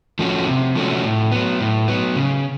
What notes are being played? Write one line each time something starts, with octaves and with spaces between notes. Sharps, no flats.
F3 A3 C#4 F#4
C3
F3 A3 C#4 F#4
A2
F#3 B3
A2
F#3 B3
C#3